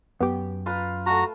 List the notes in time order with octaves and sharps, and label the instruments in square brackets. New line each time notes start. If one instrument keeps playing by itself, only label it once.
[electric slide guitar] F#2 [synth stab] B3 G4
[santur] F4 B4 A#5
[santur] A3 A5 [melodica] F#4 A#5